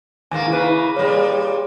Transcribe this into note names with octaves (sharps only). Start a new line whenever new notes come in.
D#2 G#2 A#3 G#5
C#3 A#3 E4 B4
A#2 G3 G#4 C#5